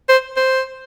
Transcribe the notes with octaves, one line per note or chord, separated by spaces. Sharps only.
C5
C5